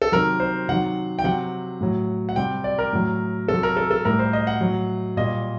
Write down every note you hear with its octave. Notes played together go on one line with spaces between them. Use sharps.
A4
C3 D#3 F#3 A#4
C5
C3 D#3 F#3 F#5
G5
C3 F#3 F#5
A2 F#3
F#5
C3 G3 G5
D5
A#4
A2 F#3
C3 F#3 A4
A#4
A4
A4
A2 G3 A#4
C5
D#5
F#5
A2 F#3
A#2 G3 D#5